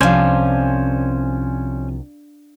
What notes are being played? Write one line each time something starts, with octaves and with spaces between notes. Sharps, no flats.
C2 C3 F3 C#4 D4 C5 F5 G#5